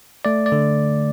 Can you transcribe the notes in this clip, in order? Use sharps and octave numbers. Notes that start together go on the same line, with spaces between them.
A3 D5
D5
D3